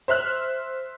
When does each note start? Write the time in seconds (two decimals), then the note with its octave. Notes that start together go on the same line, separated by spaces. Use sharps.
0.08 C5 E5 F6 F#6